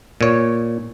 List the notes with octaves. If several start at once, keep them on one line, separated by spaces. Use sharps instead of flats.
A#2 C#5